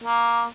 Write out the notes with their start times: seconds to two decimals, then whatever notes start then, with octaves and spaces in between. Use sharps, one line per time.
0.04 A#3